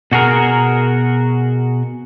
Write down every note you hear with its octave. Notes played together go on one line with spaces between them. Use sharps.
B2 F#4 G#4 A#4